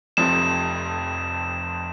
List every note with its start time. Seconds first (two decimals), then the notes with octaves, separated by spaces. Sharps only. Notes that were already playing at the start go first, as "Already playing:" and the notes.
0.17 F1 F2 C3 F3 E7